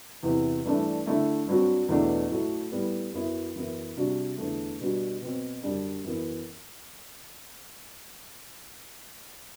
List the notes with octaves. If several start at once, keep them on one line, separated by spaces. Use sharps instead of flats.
E2 C3 E3
G2 E3 A3 D4
D3 A3 E4
G2 F#3 C4 F#4
E2 B2 A3 D4
A2 F#3 A3
A2 G3 B3
F#2 F#3 B3 E4
F#2 E3 B3 E4
C3 G3 D4 F#4
E2 D3 A3
B2 G3 D4 F#4
B2 F#3 C4
F#2 D3 G3 D4
F#2 E3 B3